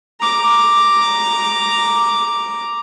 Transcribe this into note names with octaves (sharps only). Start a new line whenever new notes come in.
A#5 D6